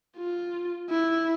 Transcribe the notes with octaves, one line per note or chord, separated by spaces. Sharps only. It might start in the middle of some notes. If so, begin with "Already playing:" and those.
F4
E4